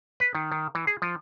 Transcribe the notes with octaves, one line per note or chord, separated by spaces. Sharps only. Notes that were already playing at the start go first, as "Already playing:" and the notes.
B4
D#3
D#3
E3
G#4
F3